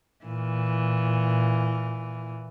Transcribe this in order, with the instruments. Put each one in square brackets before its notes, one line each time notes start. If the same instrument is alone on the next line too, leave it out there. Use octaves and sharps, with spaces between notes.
[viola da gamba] A#2 E3